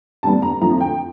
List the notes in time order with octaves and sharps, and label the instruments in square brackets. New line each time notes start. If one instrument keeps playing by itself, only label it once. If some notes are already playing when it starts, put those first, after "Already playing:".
[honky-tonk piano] G2 D3 G3 B3 A5
A#5
F2 D3 F3 A3 A#5
G5